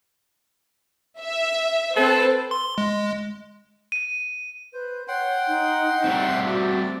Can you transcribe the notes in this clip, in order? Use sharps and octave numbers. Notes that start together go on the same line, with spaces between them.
E5
C4 A4 B4 C5
C6
G#3
D#7
B4 C5
C#5 F#5 G5 C6
D#4
G3 A3 C4
F#4 D5